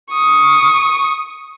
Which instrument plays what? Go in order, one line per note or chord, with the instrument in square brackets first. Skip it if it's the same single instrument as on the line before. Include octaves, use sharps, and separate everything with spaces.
[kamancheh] C#6 D#6